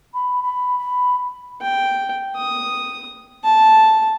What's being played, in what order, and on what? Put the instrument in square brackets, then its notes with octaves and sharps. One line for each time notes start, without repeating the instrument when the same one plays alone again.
[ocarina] B5
B5
B5
[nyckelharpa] G5
D#6
A5